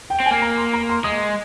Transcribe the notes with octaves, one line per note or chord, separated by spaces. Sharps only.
G5
C4
G#5
A#3
A#5
C6
A#5
C6
G#3 D#6